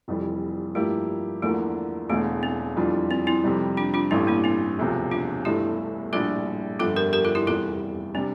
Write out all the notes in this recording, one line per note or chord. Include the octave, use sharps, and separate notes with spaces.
F1 F2 E3 G3
G2 F3 A3 A#3 E4 G4
E2 D3 F3 A3 A#3 E4
E1 E2 D3 A3
C4
F2 E3 G3 D4 F4
C4
C4 E4
F2 C3 G3
D4 F4
D4 F4
A1 G2 E3 A3 C4 E4
A#3 D4
C4 E4
E1 D2 C3 F3
D4 F4
G1 G2 E3 A3 E4 G4
A#1 A2 G3 D4 F4 A4
G1 F2 D3 G3 F4 A4
G4 A#4
G4 A#4
F4 A4
E4 G4
F1 E2 E3 G3 F4 A4
C3 G3 C4 D4